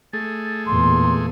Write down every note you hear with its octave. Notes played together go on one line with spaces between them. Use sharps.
A3 G#4 A6
E2 A#2 C6